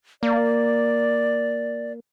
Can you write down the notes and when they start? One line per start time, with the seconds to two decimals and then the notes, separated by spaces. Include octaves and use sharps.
0.23 A#3 D5